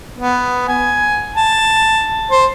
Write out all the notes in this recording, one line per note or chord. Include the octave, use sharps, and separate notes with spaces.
B3
G#5
A5
C5